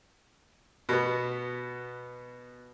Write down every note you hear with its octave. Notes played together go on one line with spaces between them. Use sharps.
B2 B3